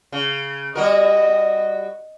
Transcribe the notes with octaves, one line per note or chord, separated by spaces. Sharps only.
C#3
G3 F#4 A#4 D#5